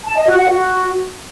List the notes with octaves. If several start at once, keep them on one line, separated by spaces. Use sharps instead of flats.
A5
D#5
F#4
F#5
F#4